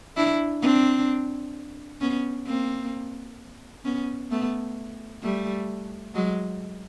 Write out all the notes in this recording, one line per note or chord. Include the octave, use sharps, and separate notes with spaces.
D4 E4
C4 D4
B3 C#4
A#3 C4
B3 C#4
A3 B3
G3 A3
F#3 G#3